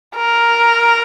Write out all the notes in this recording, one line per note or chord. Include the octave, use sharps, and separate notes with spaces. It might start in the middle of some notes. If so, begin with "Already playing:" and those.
A#4